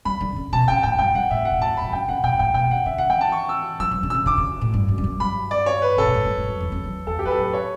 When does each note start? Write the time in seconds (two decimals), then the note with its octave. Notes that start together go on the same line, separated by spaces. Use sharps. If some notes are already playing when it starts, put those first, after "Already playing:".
0.05 G3 B5
0.21 D3
0.36 C#3
0.52 B2 A5
0.68 C#3 G5
0.83 A2 G5
0.99 G2 G5
1.14 G2 F#5
1.31 A2 E5
1.45 F#5
1.52 B2
1.57 A2 A5
1.69 F#2
1.77 A2 B5
1.92 C#3 G5
2.08 C#3 F#5
2.23 B2 G5
2.34 B2
2.39 A2 G5
2.54 B2 G5
2.71 D3 F#5
2.86 D3 E5
2.98 F#5
3.10 E3 G5
3.21 A5
3.32 C#6
3.49 E6
3.80 F#3 E6
3.91 E3
4.03 D3
4.10 C#3 E6
4.26 D3 D6
4.38 C#3
4.61 A2
4.74 G2
4.88 F#2
4.98 G2
5.04 F#2
5.20 G2 B5
5.51 D5
5.66 C#5
5.82 B4
5.97 C#3 A4
6.06 B2
6.14 A2
6.25 G2
6.37 G2
6.44 E2
6.48 F#2
6.60 E2
6.72 F#2
6.84 E2
6.95 E2
7.07 E2 A4
7.19 G4
7.23 F#2 B4
7.30 A4
7.38 A2 B4
7.53 C#5